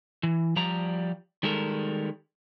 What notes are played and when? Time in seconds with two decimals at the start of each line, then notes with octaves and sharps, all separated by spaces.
0.23 E3
0.56 F3 G3 D5 A#5
1.43 D#3 G3 G#3 A4 A#4